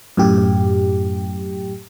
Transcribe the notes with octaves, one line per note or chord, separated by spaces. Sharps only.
F#2 A2 G4